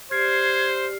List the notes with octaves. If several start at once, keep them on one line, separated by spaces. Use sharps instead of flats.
G4 C5 D5 F6 G#6 C7